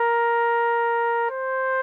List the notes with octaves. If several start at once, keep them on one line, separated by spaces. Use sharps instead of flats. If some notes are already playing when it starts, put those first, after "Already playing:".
Already playing: A#4
C5